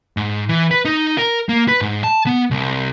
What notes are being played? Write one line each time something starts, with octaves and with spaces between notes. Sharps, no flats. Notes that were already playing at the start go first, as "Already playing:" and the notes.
G#2
E3
B4
D#4
A#4
A#3
B4
G#2
A5
B3
C2